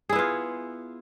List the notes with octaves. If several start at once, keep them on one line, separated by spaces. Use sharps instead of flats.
B3 E4 F4 G#4